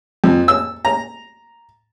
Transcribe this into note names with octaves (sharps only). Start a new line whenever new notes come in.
F2
E6
A#5